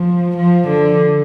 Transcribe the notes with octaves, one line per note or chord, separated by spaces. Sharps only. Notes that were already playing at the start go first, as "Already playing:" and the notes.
Already playing: F3
F3
D3